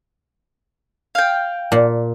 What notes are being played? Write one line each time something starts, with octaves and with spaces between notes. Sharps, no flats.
F5 G5
A#2